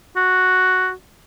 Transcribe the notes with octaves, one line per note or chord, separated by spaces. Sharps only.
F#4